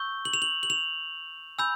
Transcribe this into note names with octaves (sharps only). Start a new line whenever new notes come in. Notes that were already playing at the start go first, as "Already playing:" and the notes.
Already playing: C#6 E6 G6 G7
F#7
F7
F#7
F#7
F7
G#5 B5 E6 G6